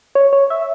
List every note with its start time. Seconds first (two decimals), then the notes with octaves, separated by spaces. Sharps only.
0.15 C#5
0.33 C#5
0.50 E5